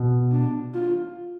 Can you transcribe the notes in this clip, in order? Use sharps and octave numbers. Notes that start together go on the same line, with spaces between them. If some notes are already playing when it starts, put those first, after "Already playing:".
Already playing: B2
D4
F4